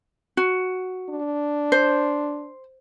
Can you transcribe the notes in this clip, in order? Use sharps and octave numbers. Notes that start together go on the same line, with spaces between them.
F#4
D4
C5